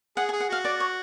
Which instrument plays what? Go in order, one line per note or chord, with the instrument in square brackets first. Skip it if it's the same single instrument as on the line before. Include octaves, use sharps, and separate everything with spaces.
[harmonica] G#4 [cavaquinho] F#5
[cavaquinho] G#5
[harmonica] G#4
[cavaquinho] F#5
[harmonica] F#4 [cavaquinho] F5
[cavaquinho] D5
C#5